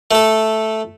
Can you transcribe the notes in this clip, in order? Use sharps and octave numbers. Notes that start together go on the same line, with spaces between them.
A3 A4